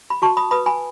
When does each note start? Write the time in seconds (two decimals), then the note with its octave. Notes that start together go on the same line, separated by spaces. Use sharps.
0.10 B5
0.22 F#4 A5 C#6
0.37 B5 D#6
0.51 B4 B5 D#6
0.66 G#5 B5